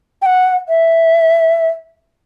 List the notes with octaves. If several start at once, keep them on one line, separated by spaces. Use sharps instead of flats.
G5
F#5
E5